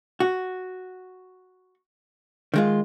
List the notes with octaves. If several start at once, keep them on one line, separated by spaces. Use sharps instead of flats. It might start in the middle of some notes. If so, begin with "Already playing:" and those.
F#4
D#3 G#3 F4